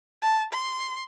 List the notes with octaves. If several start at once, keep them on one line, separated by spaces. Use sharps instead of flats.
A5
C6